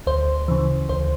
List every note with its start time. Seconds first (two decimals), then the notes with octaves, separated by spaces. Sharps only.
0.07 D2 C5
0.48 C#3 E3
0.89 D2 C5